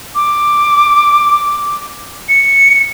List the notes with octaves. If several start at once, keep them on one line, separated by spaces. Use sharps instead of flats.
D6
C#7